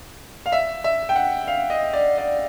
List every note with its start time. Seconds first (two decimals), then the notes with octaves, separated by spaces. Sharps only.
0.46 F5
0.52 E5
0.84 E5
1.09 G5
1.16 F#5
1.47 F5
1.70 D#5
1.93 D5
2.18 D5